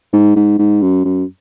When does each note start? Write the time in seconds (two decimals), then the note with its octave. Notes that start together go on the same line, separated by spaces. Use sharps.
0.13 G#2
0.36 G#2
0.59 G#2
0.82 F#2
1.05 F#2